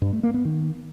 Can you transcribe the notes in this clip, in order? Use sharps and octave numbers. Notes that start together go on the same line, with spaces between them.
G2
A3
A#3
B3
D#3